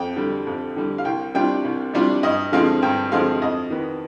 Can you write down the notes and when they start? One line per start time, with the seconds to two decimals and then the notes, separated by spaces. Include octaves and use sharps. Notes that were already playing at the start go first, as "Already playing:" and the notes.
Already playing: F2 G5
0.17 D3 G3
0.47 F2
0.76 D3 G3
0.98 F5
1.05 C2 G5
1.34 C3 G3 D4 F4 G5
1.64 C2
1.94 C3 G3 D4 F4
2.23 G2 D#5
2.52 D3 F3 G#3 C4 F5
2.82 G2 G5
3.12 D3 F3 G#3 C4 F5
3.42 F2 D#5
3.70 D#3 B3